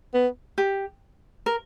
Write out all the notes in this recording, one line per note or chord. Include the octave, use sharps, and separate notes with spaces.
B3
G4
A#4